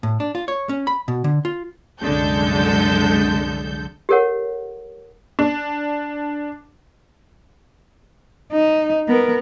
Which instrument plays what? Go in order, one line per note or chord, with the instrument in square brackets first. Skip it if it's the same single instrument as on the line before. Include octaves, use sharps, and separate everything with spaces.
[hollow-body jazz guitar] A2
D4
F4
C#5
C#4
B5
B2
D3
F4
[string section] C2 F#2 D3 G#3 A4 G6
[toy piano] G4 A4 A#4 C#5 F#5
[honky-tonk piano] D4
[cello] D#4
B3 A#4